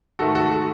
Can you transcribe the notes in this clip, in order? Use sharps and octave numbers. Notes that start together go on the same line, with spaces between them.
G#2 D#3 A3 F#4 A4
F#4 A4
F#4 A4